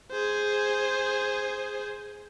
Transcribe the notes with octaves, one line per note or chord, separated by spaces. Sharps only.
G#4 C5